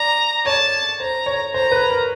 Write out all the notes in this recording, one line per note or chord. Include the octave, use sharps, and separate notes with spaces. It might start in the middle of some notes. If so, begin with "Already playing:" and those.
Already playing: D5 A#5
C#5 A5
C5 A#5
C#5
C5 A#5
B4
A#4